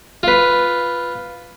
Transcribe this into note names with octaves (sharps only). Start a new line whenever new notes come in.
F4 B4